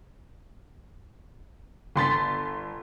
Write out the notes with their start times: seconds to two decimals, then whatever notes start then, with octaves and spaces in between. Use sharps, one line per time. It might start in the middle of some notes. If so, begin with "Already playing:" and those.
1.96 G1 C6 A6 B6